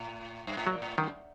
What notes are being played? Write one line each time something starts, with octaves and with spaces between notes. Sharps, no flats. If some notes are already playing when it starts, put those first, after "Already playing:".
Already playing: A2
G2
A2
A#2 F#3
A2
F#2 D#3